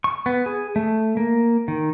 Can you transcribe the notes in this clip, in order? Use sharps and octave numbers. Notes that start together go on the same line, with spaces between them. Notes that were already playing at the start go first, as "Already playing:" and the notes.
C#6
B3
G#4
A3
A#3
D#3